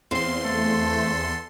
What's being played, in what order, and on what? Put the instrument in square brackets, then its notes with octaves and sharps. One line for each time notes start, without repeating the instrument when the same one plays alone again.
[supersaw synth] E2 C6 [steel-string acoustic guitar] C4 F5
[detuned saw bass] A3 [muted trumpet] A4